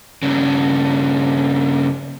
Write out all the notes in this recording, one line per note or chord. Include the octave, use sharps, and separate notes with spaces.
G2 C#3